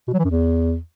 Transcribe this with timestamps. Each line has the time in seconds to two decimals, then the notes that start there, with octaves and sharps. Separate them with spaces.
0.08 B2
0.13 F#3
0.19 E3
0.25 F#2
0.30 E2